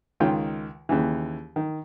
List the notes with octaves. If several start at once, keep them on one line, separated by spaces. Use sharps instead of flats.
C#2 D#3 F4 G5
D#2 C#3 E3
D#3